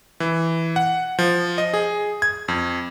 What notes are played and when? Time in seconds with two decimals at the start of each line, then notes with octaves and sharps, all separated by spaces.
0.20 E3
0.76 F#5
1.19 F3
1.58 D#5
1.74 G#4
2.22 G#6
2.48 F2